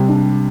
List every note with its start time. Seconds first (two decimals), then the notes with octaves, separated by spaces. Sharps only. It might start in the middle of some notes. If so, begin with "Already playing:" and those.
Already playing: C3 G3
0.08 D4